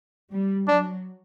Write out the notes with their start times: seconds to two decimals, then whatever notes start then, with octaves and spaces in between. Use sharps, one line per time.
0.30 G3
0.67 F#3 D4